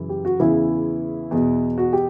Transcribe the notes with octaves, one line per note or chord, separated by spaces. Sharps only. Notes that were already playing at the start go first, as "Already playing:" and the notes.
Already playing: F#2 C#3 E3
G4
F#4
E2 C#3 E3 E4
E2 B2
F#4
G4